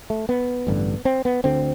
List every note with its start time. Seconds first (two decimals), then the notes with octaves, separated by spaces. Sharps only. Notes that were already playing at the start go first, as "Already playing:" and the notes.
0.10 A3
0.29 B3
0.67 A1 G2 D3
1.05 C4
1.25 B3
1.44 D2 D3 C4